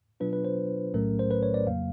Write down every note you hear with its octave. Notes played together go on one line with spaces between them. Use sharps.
B2 F#3 B3 D4 F4 B4
B4
C5
B1 A2 F#3 A3 C#4 A#4
C5
B4
C#5
D5
F2 C#3 F#3 A#3 F5